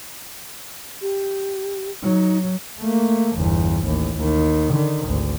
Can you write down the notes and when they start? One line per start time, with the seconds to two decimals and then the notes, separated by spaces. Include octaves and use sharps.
1.01 G4
2.03 F#3 D#4
2.80 A3 A#3
3.36 G1 E2
3.83 A1 D#2
4.17 D#2 D#3
4.72 D3 D#3
5.06 G#1 D2